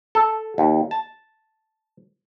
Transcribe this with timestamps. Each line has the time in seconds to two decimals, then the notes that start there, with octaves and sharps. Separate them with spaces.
0.15 A4
0.58 D#2
0.91 A5